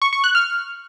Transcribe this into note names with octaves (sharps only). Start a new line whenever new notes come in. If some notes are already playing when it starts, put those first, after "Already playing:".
C#6
C#6
F#6
F6